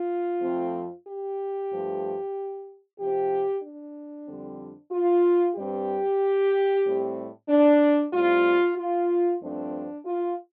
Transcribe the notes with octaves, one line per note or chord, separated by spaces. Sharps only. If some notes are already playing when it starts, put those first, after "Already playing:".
Already playing: F4
F2 F3 A3 C4
G4
G2 F3 A3
C3 F3 C4 G4
D4
F2 D3 G3 C4
F4
G2 G3 C4 G4
A2 G3 C4
D4
A2 G3 C4 F4
F4
G2 F3 A3 C4 D4
F4